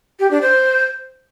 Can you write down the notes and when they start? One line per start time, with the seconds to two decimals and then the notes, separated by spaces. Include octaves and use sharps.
0.20 G4
0.31 D4
0.42 C5